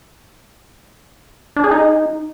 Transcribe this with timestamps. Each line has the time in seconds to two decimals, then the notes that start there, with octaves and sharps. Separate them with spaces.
1.56 D4
1.64 G#4
1.71 D#4